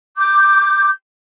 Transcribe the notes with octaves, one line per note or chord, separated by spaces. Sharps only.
D6 G6